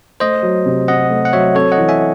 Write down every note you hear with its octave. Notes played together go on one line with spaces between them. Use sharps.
A3 C5 D#5
F#3
C3
C4 D#5 F#5
A3
F#5
F#3 C#5 E5
C4 A4 C#5
D#5 F#5
E3
E5 G#5